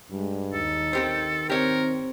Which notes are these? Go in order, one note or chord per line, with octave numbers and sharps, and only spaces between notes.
G2 G3 G#3
D#2 D#4 A4
D#3 C4 G4 C5
C4 G4 A#4 C#5